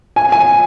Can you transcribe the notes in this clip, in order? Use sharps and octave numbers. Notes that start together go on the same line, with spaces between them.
G#5
G#5